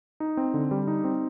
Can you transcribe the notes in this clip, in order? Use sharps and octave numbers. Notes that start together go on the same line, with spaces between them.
D#4
C4
D3
G3
D#4
C4